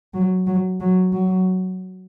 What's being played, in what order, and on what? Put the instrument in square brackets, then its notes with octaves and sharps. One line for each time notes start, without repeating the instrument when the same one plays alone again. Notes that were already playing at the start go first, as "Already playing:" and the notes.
[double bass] F#3
F#3
F#3
F#3